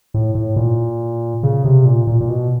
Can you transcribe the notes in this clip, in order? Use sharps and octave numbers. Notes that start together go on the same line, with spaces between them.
A2
A2
A#2
C#3
C3
A#2
A#2
A#2
B2